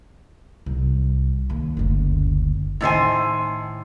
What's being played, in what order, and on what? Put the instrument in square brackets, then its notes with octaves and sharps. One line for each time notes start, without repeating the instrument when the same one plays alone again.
[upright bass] C2
D#2
F#1 D2
[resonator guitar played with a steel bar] A2 D#3 C5 G#5